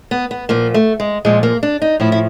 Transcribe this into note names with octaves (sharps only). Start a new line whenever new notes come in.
B3
B3
A#2 F3 A#3
A3
G#3
A#2 F3 G#3
A#3
D4
D#4
A2 F3 E4
E4